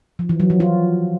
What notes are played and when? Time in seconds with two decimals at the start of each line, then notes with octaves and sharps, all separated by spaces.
0.19 F3
0.29 E3
0.40 F#3
0.50 F3
0.60 F4